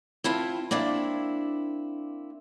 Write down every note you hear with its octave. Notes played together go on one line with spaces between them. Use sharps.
C4 E4 F4 A5
A#3 C4 D4 E4